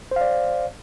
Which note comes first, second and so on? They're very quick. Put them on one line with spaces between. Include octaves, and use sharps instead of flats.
C5 F5 D5